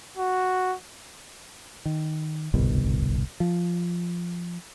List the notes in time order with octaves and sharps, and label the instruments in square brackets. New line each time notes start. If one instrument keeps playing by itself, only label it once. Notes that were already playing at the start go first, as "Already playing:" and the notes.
[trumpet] F#4
[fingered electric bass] D#3
D1 G1 C2 B2
F3